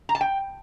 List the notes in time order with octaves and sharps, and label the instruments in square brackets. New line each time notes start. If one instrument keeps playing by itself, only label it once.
[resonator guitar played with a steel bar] A#5
A5
G5